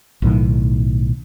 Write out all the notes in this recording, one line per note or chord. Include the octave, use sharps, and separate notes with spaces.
B1 A2 D#3 F#3